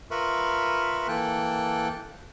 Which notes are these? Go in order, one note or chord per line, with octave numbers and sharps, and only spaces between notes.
F4 A#4 B4 E5 B5 C#6
E3 A#3 A4 G5 F#6